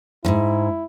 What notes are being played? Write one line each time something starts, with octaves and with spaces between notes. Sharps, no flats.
F2 G#2 E4